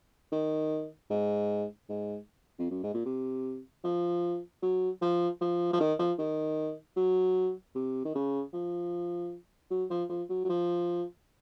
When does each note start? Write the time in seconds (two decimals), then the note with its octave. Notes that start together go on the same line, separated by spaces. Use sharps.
0.32 D#3
1.10 G#2
1.89 G#2
2.59 F2
2.70 F#2
2.83 G#2
2.94 A#2
3.06 C3
3.84 F3
4.62 F#3
5.02 F3
5.41 F3
5.73 F3
5.80 D#3
5.99 F3
6.19 D#3
6.97 F#3
7.75 C3
8.05 D#3
8.15 C#3
8.53 F3
9.71 F#3
9.90 F3
10.09 F3
10.29 F#3
10.44 F#3
10.49 F3